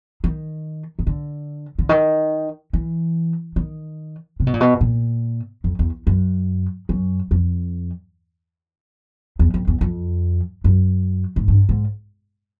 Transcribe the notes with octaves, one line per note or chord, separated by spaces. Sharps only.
D#3
D#3
D3
D3
D#3
E3
D#3
C3
B2
A#2
B2
A#2
F2
E2
F#2
F#2
F2
E2
F2
E2
F2
F#2
G#2
G2
G#2